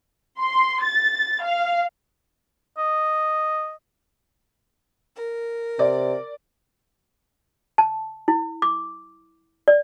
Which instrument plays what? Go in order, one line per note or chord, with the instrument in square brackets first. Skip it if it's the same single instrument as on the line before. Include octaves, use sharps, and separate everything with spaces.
[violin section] C6
A6
F5
[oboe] D#5
[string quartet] A#4
[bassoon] C3 [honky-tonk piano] D5
[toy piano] A5
E4
D6
D5